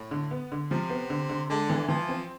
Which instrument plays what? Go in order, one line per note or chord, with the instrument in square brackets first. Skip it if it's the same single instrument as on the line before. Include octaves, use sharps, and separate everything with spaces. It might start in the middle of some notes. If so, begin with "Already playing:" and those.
Already playing: [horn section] A2
[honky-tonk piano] D3
B3
D3
[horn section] C3 [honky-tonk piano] F3
[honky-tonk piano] B3
D3
D3
[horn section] D3 [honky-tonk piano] G#3
[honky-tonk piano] E3
[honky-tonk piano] E3 [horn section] F3
[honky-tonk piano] C4